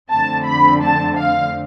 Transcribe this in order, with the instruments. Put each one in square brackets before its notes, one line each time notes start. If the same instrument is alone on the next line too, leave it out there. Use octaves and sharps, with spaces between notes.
[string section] F2 D3 A3 C4 A5
B5
A5
F5